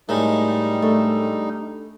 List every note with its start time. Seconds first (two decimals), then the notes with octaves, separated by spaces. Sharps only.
0.09 A2 D#3 G3 G#3 D#4
0.82 A3 D4